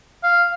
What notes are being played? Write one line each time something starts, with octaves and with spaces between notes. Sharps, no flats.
F5